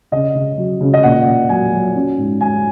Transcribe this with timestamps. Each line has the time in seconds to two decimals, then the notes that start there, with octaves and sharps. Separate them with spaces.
0.12 C#3 D#5
0.35 C#3
0.57 F#3
0.81 C#3
0.94 D#5
1.03 A#2 F#5
1.26 A#2
1.49 F#3 G#5
1.73 F#3
1.96 C#4
2.17 G#2
2.41 G#2 G#5